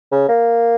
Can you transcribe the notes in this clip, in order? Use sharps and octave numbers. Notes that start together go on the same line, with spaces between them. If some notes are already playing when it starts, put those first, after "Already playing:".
C#3
A#3